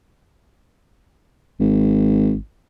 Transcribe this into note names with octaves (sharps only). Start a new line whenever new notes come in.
G#1